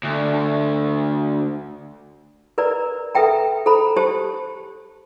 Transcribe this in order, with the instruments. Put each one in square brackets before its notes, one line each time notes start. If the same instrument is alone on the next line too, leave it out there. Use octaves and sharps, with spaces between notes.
[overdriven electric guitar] D2
[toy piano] A#4 B4 D5 A#5
A4 B4 E5 G5 A#5
A4 C5 A#5 B5
G4 C5 A5